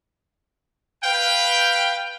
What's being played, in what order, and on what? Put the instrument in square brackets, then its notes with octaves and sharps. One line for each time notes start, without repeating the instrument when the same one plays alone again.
[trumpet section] B4 F5 G5